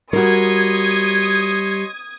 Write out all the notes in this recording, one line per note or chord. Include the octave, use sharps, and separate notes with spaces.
G3 F#4 A#4 C#5 D#5 C6 D#6 G#6